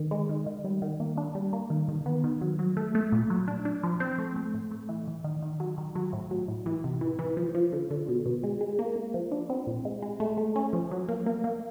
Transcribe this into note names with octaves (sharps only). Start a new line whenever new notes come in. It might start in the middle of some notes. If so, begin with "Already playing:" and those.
Already playing: D#3
G#3
D#3
D#3
G3
D#3
A#3
D4
G3
A#3
D#3
D#3
B3
D#3
F#3
F#3
A3
A3
A#2
F#3
D4
D4
F3
C4
A3
A3
A2
A3
E3
E3
D#3
D#3
F#3
D#3
F#3
A2
F#3
A2
E3
C3
E3
E3
F3
F3
D3
D3
B2
B2
G#3
G#3
A#3
A#3
F3
D4
C4
A#2
G#3
G#3
A3
A3
C#4
F3
F#3
A#3
A#3
A#3